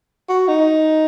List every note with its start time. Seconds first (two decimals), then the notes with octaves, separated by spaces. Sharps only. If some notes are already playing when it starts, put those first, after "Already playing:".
0.29 F#4
0.48 D#4